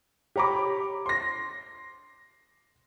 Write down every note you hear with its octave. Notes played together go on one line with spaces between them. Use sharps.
G4 C#5 A#5 B5 D6
C6 A#6